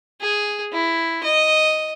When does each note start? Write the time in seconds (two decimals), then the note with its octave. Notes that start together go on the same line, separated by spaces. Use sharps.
0.21 G#4
0.72 E4
1.23 D#5